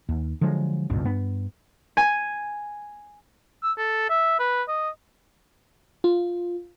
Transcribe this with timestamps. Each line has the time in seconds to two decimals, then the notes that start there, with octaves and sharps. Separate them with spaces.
0.09 D#2
0.41 D3 F3 F#3 G#3
0.90 G#1 C#2 G2 B2
1.04 G2 B3
1.97 G#5
3.63 E6
3.78 A4
4.09 E5
4.39 B4
4.68 D#5
6.04 F4